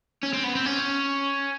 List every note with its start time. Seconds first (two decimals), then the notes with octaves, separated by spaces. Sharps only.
0.23 C#4
0.34 C4
0.44 B3
0.55 C4
0.65 C#4